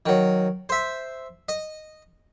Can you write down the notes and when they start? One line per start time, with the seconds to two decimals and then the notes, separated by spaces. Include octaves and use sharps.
0.06 D#3 F#3
0.69 C5 E5
1.49 D#5